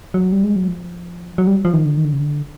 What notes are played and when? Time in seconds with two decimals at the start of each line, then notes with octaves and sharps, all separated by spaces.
0.14 F#3
0.32 G3
0.44 G#3
0.56 F#3
0.68 F3
1.38 F#3
1.47 G3
1.65 F3
1.73 D#3
1.85 D3
1.97 D#3
2.05 D3
2.13 C#3
2.20 D3